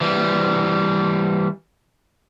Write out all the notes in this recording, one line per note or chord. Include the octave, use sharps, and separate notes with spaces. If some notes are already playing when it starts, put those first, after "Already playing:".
E3 G3